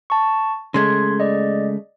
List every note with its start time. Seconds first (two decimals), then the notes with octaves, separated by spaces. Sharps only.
0.10 A5 C#6
0.74 C#3 G#3 A3 C6 G#6
1.20 D5 D#5